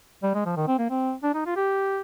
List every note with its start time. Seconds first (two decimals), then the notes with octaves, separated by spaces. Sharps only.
0.23 G3
0.35 G#3
0.45 F3
0.57 D#3
0.68 C4
0.79 A#3
0.90 C4
1.23 D4
1.34 D#4
1.46 F4
1.56 G4